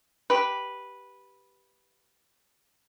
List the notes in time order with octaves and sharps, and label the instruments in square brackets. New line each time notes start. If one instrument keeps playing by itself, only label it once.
[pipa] G4 B4